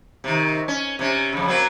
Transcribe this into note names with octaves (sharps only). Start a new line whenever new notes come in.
C3 D#3
C#4
C3 C#4
F2 C#3
F#3 A#3 C4